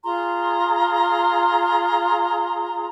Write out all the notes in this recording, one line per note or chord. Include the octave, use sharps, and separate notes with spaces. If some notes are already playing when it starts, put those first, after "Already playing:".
F4 G#4 A#5 C6